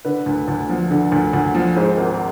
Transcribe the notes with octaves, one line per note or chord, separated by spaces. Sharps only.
D3 B4
D2
D2
F3
D3
D2
D2
F3
G#2 C5
G#1